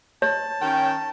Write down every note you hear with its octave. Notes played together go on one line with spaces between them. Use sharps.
C#5 A5
D#3 C#4 G5